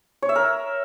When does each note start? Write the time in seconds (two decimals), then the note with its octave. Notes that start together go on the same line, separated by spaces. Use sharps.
0.22 C#5
0.29 E5
0.36 A#4